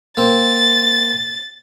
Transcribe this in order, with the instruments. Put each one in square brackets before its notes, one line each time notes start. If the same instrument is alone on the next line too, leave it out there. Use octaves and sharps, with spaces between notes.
[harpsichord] A#3 C4 [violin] A6